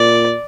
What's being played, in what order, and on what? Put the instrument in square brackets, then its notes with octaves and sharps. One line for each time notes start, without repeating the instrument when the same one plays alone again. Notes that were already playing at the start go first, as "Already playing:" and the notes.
Already playing: [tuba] A#2 [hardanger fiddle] D5